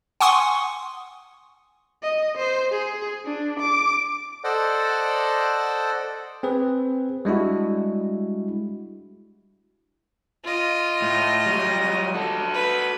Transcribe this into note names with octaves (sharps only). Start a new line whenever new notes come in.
F#5 G#5 C6 C#6 D#6
D#5
C5
G#4
D4
D6
A4 C5 D5 D#5 F#5
C4 G#4 B4
G3 G#3 D4 E4 F#4
F4 D#5
A2
F#3 G3
F#4 A4
B4